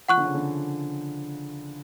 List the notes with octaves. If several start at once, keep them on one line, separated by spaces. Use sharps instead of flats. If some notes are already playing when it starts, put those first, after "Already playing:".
F3 F#5 C#6 F#6
D3
C#3
D3